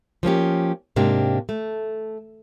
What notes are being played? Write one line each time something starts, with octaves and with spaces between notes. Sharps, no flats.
F3 A#3 C#4 G4
G#2 C3 A#3 D4 G4
A3